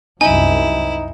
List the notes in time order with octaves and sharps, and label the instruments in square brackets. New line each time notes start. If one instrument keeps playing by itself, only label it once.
[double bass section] C2 F#2 [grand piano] D#4 [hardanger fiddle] E4 [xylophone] G#5